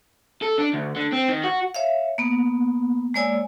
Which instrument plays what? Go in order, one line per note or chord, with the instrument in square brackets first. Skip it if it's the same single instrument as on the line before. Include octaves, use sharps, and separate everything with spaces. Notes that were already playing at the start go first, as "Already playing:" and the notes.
[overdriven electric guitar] A4
D4
D2
D3
C4
D#3
F#4
[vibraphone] C#5 E5 F5
A#3 B3
G#3 A#3 C#5 D5 G#5 E6